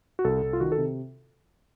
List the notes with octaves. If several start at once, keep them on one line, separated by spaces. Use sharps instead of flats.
F#4
C2 A4
C2
F4
D#3 F#4
A4
C3